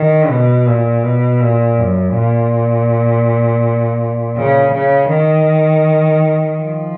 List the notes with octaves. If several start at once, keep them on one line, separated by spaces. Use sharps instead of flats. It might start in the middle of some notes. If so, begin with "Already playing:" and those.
Already playing: D#3
B2
A#2
B2
A#2
F#2
A#2
C#3
C#3
D#3
F3